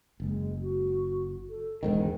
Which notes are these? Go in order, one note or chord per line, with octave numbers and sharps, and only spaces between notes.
F#1 G#3
F#4
A4
E1 G#2 D#3 G#3